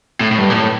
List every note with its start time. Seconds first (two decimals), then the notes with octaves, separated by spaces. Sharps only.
0.20 A2
0.31 A2
0.38 G2
0.50 A#2
0.55 A2